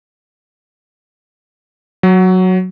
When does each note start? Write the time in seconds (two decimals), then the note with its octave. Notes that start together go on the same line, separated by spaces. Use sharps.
2.03 F#3